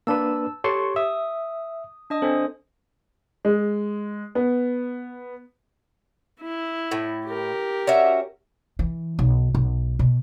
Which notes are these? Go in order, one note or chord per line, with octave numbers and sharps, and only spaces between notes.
A#3 D4 B4 A5 E6
G4 A4 C#5 C6 C#6
E5 D#6
D4 D#5 D#6
C4 D4 A4 C5 G#5
G#3
B3
E4
A2
G4 A#4
C#4 F#4 E5
E3
B1
B1
B2